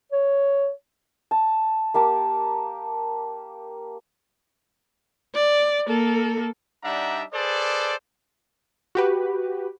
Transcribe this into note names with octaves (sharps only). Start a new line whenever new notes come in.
C#5
A5
A#3 G4 A5
D5
A#3 A4
G3 D4 D#4 E5 F#5 A#5
G#4 A4 B4 C5 D5
F#4 G4 B4